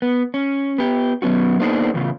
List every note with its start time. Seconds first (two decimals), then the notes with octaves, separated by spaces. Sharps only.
0.02 B3
0.34 C#4
0.78 B3 G4
1.22 F#3 B3 C#4 F#4
1.60 A#3 B3 D4 D#4 G#4 C5
1.94 E2 A2 C#3 F4